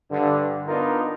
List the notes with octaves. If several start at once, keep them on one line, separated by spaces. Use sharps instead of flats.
G2 D3
B3 D4 D#4 F4 A#4